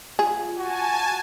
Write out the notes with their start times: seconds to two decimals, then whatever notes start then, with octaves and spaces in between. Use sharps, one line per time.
0.19 F4 G#4
0.57 F#4 G#5 A5